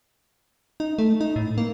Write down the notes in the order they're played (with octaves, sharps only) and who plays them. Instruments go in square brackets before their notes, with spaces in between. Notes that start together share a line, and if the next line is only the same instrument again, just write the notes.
[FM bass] D#4
A3
D#4
A2
A#3